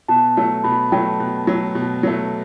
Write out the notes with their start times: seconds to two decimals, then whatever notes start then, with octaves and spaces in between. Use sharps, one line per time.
0.08 B2 A5
0.37 F#3 A3
0.64 B2 B5
0.92 F#3 A3 G5
1.20 B2
1.47 F#3 A3
1.75 B2
2.03 F#3 A3